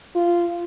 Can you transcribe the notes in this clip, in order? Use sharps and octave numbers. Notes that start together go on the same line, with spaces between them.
F4